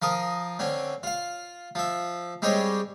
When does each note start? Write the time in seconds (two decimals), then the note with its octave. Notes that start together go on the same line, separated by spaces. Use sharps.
0.02 F3 A#4 D#6
0.59 D3 C4 C#4
1.03 F4 F5
1.75 F3 E5
2.42 G3 G#3 C4 G4 C#5 D#5